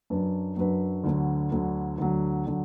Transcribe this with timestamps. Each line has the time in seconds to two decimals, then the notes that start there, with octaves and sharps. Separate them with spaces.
0.10 F#2 F#3 D4 B4
0.57 F#2 F#3 D4 B4
1.04 D2 D3 F#3
1.52 D2 D3 F#3
1.99 D2 D3 F#3
2.47 D3 F#3